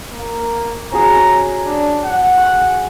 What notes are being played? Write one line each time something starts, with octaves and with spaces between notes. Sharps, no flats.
A#3
C#4 F#4 G#4 A#5
D4
F#5
C#6